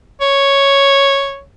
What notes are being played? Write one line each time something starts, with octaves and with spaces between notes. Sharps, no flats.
C#5